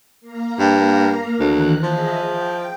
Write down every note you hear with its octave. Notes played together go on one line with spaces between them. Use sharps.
A#3 F5 A#5
G2
D2 D#3 E3 F#6
F3 G#4 D#5 E5
G5